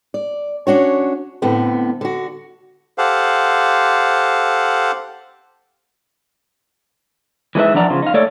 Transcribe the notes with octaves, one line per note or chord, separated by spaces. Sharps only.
D5
C#4 D4 F#4 C#5
A2 D3 B3 C4
D3 F#4
G4 A4 C5 F5 F#5
E3 G#3 D#4 B4 E5
E3 F3 D4 D5 F#5 A#5
C#3 F3 F4
D#4 F5
A3 A4 C#5 D5